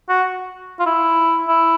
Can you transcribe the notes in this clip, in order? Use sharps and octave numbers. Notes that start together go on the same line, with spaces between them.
F#4
F4
E4
E4